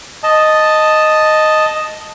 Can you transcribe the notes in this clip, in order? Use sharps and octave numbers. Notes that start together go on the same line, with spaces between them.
D#5 A5